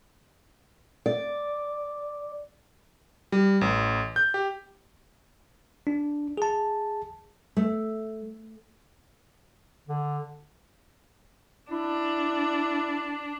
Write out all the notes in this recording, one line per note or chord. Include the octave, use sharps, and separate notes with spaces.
D5
G3
A1
G6
G4
D4
G#4 A5
A3
D3
D4 E4